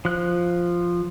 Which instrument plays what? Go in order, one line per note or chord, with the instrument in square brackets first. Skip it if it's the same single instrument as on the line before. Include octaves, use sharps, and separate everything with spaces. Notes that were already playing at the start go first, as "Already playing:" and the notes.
[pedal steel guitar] F3 F#6